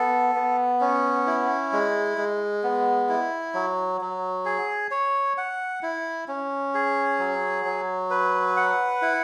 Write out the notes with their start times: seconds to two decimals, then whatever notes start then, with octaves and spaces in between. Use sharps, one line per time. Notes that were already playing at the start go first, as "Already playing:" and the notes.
Already playing: B3 A4
0.35 B3
0.81 C#4
1.27 E4
1.73 G#3
2.18 G#3
2.63 B3
3.09 E4
3.54 F#3
4.01 F#3
4.45 G#4
4.91 C#5
5.38 F#5
5.83 E4
6.28 C#4
6.75 G#4
7.19 F#3
7.65 F#3
8.10 B4
8.57 F#5
9.02 E4